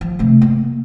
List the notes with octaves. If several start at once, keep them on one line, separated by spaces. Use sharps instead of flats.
F3
C3 A3
A#3